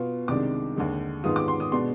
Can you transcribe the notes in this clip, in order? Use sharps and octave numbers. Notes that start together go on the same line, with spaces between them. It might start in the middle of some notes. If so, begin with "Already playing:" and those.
Already playing: B2 B3 F4
C2 C3 D#3 G#3 D4 D6
D#2 D3 G#3
G#2 D#3 G#3 B3 F4 D#6
D6
C6
D#6
B2 G#3 D4 C6